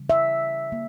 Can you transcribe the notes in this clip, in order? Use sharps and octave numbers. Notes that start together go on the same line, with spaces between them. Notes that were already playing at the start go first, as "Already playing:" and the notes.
Already playing: C#3 E3 G3
E5
A#3